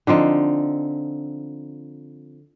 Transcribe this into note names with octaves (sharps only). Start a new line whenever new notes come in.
D3 F3 C4 D#4